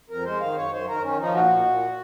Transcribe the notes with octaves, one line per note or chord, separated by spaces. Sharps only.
F2 A#4
G#3 C5
D#3 F5
F#2 C#5
F#2 C5
D#3 A#4
D#3 C#4
F3 D#4
A#2 F#4
A#2
A#2